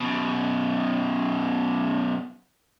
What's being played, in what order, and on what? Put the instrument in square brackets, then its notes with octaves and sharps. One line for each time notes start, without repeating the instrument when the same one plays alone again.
[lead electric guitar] F#2 B2